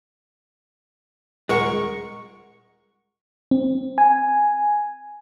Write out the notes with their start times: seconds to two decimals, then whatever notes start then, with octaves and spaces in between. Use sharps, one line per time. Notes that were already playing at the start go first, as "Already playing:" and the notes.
1.49 D#1 G#3 A#4 F#5 C#6
3.51 C4
3.98 G#5